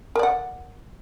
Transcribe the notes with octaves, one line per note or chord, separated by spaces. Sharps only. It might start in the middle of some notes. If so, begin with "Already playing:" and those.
A#4 D5 F#5